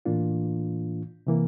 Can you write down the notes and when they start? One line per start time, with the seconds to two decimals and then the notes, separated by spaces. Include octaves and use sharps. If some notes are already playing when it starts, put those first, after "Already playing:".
0.05 A2 E3 A#3 D4 F4
1.27 C3 E3 A#3